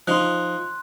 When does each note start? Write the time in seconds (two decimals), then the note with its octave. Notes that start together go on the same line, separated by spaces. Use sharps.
0.07 F3 D#4 C6 F#6